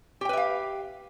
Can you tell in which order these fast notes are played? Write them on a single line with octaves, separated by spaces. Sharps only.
G4 G5 B4 E5 F5